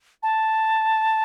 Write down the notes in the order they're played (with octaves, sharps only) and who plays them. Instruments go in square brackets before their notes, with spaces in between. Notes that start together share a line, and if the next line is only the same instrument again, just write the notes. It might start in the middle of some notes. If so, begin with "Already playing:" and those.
[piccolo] A5